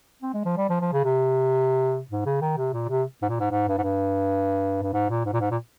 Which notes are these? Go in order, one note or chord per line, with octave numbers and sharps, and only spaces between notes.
C4
G#3
F3
G3
F3
F3
C#3
C3
G#2
C#3
D#3
C3
A#2
C3
G#2
A#2
G#2
G#2
G2
G#2
G2
G2
G#2
A#2
G#2
A#2
G#2
A#2